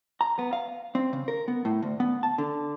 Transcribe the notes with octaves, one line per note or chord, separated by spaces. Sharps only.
A#5
B3
F5
C4
C#3
A#4
B3
A2
D2
B3
A5
D3